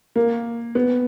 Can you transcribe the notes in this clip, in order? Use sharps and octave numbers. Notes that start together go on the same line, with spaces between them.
A#3
B3